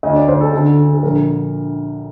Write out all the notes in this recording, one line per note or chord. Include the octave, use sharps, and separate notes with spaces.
D2 D#5
D5
D2 C5
A4
D3 A4
D3
A4
A#1 A#4